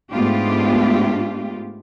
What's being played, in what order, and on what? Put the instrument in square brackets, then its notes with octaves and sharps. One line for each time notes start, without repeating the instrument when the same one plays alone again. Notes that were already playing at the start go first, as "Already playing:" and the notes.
[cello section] G#2 A3 B3 D4 F4 G4